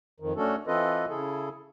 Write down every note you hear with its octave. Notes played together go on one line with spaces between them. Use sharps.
F2 D#3
A3 C#4 D4 F#4 A4
E3 C4 F4 A4 B4 D#5
C#3 E4 G#4 A4